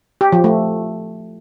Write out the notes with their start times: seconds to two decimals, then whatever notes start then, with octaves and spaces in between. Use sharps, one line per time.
0.21 G4
0.32 F3
0.44 A3